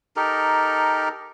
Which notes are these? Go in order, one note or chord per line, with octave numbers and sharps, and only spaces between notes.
D#4 G4 A4 A#4